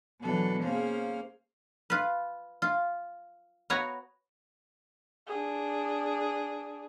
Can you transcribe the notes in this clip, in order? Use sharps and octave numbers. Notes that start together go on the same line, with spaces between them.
B2 E3 F#3 D4 A4 B4
A#3 C#4 G#4 C5 F5
F4 B4
F4
B3 F#4 B4 C#5 A#5
D4 G#4